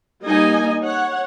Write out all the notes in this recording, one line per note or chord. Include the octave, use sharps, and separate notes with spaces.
G3 A#3 D#4 D#5 G#5
C#5 F#5